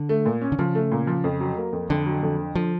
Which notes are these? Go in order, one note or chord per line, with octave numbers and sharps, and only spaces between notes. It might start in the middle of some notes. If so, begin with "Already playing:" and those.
Already playing: D3
A3
A#2
C#4
D3
C#3 F3
A3
A#2
F3
F2
F#3
A#3
F2
F2 D3
F#3
F2
D3
D3 F3